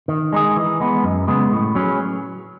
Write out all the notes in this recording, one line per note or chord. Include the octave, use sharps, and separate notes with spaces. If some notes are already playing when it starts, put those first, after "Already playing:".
D#3
G#3 D#4 G#4
E3
G#3 B3
F#2
C#3 G#3 B3
A2
F#3 C#4 G#4 B4